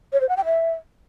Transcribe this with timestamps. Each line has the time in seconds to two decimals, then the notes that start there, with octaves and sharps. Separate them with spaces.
0.13 C#5
0.21 C5
0.29 F#5
0.37 G5
0.45 E5